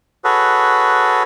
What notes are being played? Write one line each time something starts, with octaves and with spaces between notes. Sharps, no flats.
F#4 G#4 A4 B4 C#5